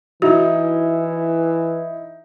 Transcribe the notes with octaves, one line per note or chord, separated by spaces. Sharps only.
E3 D#4 E4 F#4